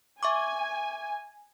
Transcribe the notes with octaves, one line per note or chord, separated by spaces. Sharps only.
E5 G#5 C#6 D6